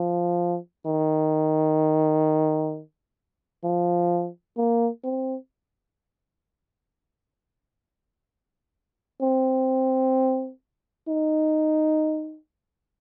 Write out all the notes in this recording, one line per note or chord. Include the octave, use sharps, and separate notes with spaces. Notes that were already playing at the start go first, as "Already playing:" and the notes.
Already playing: F3
D#3
F3
A#3
C4
C4
D#4